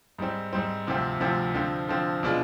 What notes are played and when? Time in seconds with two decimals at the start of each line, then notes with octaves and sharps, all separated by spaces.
0.19 G#2 G3 C4
0.53 G#2 G3 C4
0.87 D2 C3 F3 C4
1.20 D2 C3 F3 C4
1.54 D3 F3 C4
1.88 D3 F3 C4
2.23 B2 G#3 D4 F4